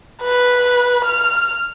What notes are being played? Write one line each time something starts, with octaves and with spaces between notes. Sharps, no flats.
B4
F6